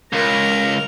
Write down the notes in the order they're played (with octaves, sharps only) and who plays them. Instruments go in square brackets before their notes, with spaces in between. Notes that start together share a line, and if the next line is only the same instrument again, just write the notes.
[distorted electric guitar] C#2 [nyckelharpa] A#4 A#5